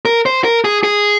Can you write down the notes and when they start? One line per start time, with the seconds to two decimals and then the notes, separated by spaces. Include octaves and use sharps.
0.05 A#4
0.26 C5
0.44 A#4
0.65 G#4
0.83 G#4